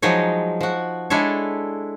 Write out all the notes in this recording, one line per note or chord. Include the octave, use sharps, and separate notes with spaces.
F3 F#3 G#3 D#4 C#5
F3 F#4
G#3 D4 E4 A4 C#5